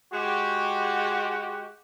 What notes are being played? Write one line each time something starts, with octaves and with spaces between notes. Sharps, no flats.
G#3 F#4 G4